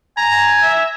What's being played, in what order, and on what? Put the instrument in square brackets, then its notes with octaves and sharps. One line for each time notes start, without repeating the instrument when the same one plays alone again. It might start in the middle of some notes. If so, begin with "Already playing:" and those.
[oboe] G#5 [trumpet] A#5
[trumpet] E5